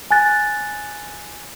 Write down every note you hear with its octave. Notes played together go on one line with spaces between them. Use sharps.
G#5 F#6 A6